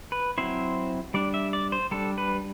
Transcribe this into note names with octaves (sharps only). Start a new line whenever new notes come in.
B4
F#3 C4 E4 C5
G3 D4 D5
E5
D5
C5
G3 D4 A4
B4